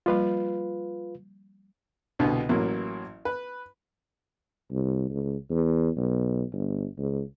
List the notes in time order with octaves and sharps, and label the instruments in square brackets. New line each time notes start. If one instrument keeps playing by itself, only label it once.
[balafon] F3 G3 A#3 [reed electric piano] F4 B4 F5
[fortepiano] C2 B2 D3 B3
A1 F#3 A#3 E4
B4
[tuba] C2
C#2
E2
B1
G1
C#2